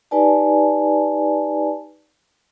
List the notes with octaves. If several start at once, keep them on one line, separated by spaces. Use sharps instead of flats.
D#4 G4 B4 D5 G#5 A5